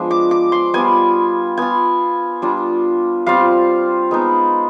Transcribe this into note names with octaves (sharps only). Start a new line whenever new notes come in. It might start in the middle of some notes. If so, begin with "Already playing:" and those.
Already playing: F3 G#3 B3 D4
D6
D6
C6
G3 B3 F4 G#5
B3 F4 G#5
G3 D4 F4
G3 C4 F4 F5
G#3 B3 D#4